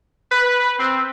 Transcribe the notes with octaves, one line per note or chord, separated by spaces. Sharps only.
B4
C4